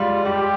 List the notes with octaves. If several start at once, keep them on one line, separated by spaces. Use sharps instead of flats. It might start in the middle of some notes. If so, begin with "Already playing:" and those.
Already playing: G3 G#3 F4
G3 G4